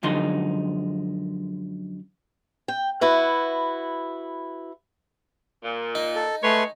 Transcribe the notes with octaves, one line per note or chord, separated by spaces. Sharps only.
F#2 D3 F3 G#3 D#4 C6
G5
E4 F#4 B4
A#2
D#4
A4
G#3 A3 B4 C#5 C6